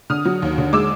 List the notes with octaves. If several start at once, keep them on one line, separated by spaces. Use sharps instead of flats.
D3 D#6 F6
F#3
D#2
D3
G#3 D6 E6